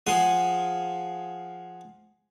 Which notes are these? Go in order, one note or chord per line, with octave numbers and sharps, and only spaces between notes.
F3 G#4 F#5 C6 D#6